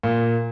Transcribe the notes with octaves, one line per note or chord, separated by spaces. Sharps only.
A#2